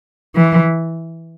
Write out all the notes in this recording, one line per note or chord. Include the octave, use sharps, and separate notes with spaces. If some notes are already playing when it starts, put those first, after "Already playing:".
E3